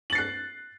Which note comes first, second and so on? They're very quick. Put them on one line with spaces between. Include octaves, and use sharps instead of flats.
F#7 A6 C7 F#6